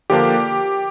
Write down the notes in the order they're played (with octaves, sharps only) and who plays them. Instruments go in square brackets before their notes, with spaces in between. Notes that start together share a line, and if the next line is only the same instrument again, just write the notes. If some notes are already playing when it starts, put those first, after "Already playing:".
[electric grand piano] D3 F3 A#3 D4 G4